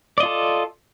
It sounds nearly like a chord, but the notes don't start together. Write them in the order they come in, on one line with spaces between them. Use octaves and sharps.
D5 D#5 F4 A4